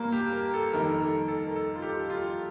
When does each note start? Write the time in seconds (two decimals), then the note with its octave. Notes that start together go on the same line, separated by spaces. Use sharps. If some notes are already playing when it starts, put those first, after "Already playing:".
Already playing: G2 A#3
0.12 G4
0.33 A#4
0.54 A4
0.73 F2 D#3 G3 A#4
1.00 A4
1.28 A4
1.47 A#4
1.56 A4
1.76 F4
1.82 G4
2.10 F4